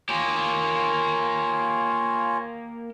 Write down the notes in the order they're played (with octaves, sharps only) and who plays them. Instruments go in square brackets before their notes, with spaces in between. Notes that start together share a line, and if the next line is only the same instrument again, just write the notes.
[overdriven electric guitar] A#3 G4 [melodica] F4 C#5 G#5